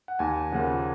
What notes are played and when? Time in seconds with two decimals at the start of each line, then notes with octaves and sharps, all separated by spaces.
0.08 F#5
0.19 D#2 G#5
0.52 C#3 F3 A#3 F#5